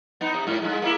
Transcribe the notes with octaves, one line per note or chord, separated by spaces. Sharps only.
B3 D#4
C3
G#2
G2 G#3
A#3 C#4 E4